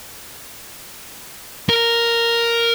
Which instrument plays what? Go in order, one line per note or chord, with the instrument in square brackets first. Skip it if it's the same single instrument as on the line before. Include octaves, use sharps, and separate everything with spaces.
[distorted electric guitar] A#4